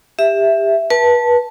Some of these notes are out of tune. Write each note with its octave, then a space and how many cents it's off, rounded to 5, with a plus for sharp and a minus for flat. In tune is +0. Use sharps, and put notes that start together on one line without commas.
G4 +25 E5 +0
B4 -30 A5 +0